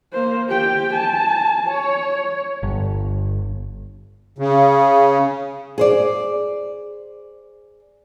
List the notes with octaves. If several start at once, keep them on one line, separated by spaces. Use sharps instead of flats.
A#3 C5
G4 G5
G#5 A5
C#5
G1
C#3
G#4 C5 D5